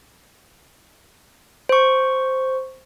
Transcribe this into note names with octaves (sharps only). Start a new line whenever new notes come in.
C5 C#6